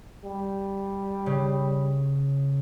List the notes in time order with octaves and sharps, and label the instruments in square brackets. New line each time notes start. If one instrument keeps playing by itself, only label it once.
[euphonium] G3
[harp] C#3